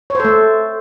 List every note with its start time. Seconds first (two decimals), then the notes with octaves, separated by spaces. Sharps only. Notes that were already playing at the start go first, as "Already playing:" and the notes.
0.10 C#5
0.15 C5
0.20 A4
0.25 A3